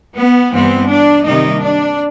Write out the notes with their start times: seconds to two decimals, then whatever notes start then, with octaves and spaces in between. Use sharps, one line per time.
0.17 B3
0.53 G2 E3 G3 B3 C4
0.88 D4
1.24 C3 D#3 G3 A#3 D#4
1.61 D4